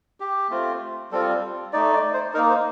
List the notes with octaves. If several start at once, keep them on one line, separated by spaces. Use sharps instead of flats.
G4
A3 C4 F4
G3 C4 F4 A4
A3 D#4 D5
D5
C5
A#3 D#4 A#4
C5